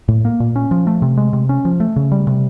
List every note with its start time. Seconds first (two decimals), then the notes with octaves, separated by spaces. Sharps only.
0.08 A2
0.25 A#3
0.40 A#2
0.56 C#4
0.71 F3
0.87 A3
1.02 C3
1.17 G#3
1.33 C3
1.49 C#4
1.65 F3
1.80 A3
1.96 C#3
2.12 G3
2.27 C3